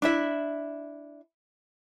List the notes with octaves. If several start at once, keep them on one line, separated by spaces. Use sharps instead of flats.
D4 E4 E5